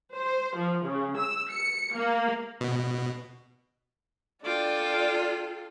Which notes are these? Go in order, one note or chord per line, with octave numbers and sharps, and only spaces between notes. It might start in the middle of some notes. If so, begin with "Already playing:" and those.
C5
F3
C#3
E6
C#7
A#3
B2
D4 F4 A4 G5 D6